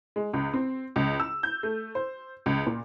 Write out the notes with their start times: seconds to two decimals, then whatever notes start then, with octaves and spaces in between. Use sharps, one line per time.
0.16 G#3
0.33 C#2
0.54 C4
0.96 C#2
1.20 E6
1.43 G6
1.63 A3
1.95 C5
2.46 C#2
2.67 A#2